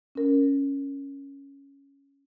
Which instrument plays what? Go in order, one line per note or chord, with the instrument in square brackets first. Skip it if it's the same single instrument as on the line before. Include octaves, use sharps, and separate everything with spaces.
[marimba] C#4 A#4